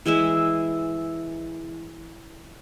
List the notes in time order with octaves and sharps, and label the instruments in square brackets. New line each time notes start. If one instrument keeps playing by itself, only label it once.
[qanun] E3 G#3 E4 E5